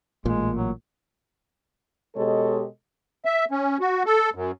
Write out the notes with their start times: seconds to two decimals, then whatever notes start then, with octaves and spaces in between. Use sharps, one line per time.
0.25 A1 A#2 G#3
0.56 F#3
2.16 B2 G#3 G4 A4 C#5 D#5
3.25 E5
3.51 C#4
3.80 F#4
4.06 A4
4.35 F#2